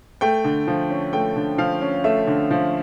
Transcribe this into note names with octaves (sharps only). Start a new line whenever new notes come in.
A3 G5
D3
F3
C#4
A3 G5
D3
F3 F5
C#4
A3 E5
D3
F3